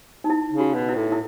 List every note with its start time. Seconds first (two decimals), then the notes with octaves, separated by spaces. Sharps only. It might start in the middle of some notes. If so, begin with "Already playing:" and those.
0.24 D#4
0.30 E4
0.53 C#3
0.60 F#4
0.75 B2
0.89 E4
0.96 A2
1.12 E4